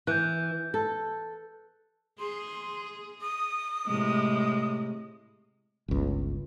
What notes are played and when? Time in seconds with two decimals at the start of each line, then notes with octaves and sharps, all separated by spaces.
0.07 E3 F#6 G6
0.74 A4
2.19 G#4 C6
3.21 D#6
3.86 A2 C3 G#3
5.88 G1 C#2